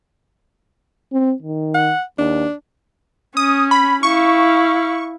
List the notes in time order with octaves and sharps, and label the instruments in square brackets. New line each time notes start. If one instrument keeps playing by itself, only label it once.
[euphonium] C4
D#3
[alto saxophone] F#5
[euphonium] D#2 [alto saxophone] D4
[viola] C#4 [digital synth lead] D#6
[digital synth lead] B5
[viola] E4 F5 [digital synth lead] C#6